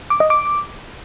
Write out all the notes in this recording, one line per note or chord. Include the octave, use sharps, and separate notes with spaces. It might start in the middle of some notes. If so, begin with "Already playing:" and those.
D6
D#5
D6